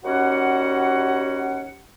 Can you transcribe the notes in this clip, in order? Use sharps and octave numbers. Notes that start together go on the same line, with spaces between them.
D#2 G3 C#4 F#4 F#5